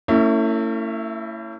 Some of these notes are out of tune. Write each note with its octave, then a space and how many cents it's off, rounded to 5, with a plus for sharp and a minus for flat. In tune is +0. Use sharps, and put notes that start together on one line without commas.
A3 +45 C#4 +0 E4 +0